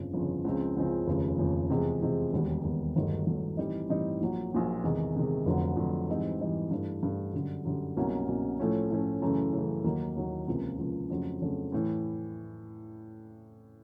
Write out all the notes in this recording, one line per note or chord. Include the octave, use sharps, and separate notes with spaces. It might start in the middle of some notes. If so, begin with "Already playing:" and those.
Already playing: G1 F2 C#3 F3
G1 F2 C#3 F3
C#2 C#3 F3 G#3 C4
C#2 C#3 F3 G#3 C4
F1 D#2 C#3 F3
F1 D#2 C#3 F3
E2 C3 F3 G#3
E2 C3 F3 G#3
E1 D#2 D#3 G3 B3
E1 D#2 D#3 G3 B3
G1 G2 D#3 F#3 A3
G1 G2 D#3 F#3 A3
A2 E3 G3 C4 D#4
A2 E3 G3 C4 D#4
A#1 A#2 F#3
A#1 A#2 F#3
E2 C3 D#3 G#3
E2 C3 D#3 G#3
F1 F2 D3 F#3
F1 F2 D3 F#3
G#2 E3 G3 C4 D#4
G#2 E3 G3 C4 D#4
G2 E3 A3 D4
G2 E3 A3 D4
F#2 D3 G3
F#2 D3 G3
C2 B2 F#3 A#3 C#4
C2 B2 F#3 A#3 C#4
A2 F3 A3 C#4
A2 F3 A3 C#4
F#2 C#3 E3 A3
F#2 C#3 E3 A3
D#2 D#3 F#3 A#3
D#2 D#3 F#3 A#3
C#2 C3 F3 A#3
C#2 C3 F3 A#3
F2 C#3 F#3 A3 D4
F2 C#3 F#3 A3 D4
A2 E3